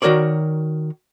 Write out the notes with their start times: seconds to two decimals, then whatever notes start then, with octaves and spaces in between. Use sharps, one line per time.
0.02 D#3 C4 F#4 A#4 C#5 D5